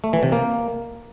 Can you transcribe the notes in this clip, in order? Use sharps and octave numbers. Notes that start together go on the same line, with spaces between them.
A3
E3
C3
A#3